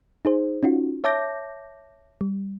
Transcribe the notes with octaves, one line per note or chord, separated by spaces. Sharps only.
D#4 G#4 C5
C#4 D#4 F4 F#4
C#5 E5 A5 D6 G6 A#6
G3